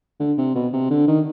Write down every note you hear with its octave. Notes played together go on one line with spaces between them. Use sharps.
D3
C3
B2
C3
D3
D#3